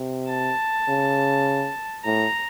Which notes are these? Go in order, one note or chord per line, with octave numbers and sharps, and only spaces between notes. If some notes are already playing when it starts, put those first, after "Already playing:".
Already playing: C3
A5
C#3
A2 A#5